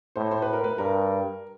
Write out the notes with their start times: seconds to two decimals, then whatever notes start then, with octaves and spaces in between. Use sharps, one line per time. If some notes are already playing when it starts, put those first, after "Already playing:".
0.16 A2 C5
0.31 C5
0.42 B4
0.53 A#4
0.64 B4
0.78 G2 A#4